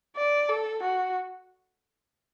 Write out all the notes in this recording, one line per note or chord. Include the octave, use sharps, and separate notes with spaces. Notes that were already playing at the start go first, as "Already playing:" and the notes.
D5
A4
F#4